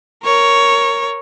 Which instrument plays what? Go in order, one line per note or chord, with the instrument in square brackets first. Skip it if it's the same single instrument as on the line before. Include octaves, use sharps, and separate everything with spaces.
[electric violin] A#4 C#5